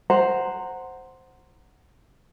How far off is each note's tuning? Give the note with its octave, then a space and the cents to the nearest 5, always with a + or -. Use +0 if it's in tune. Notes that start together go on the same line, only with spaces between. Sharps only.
C5 +0 F#5 +0 A#5 -10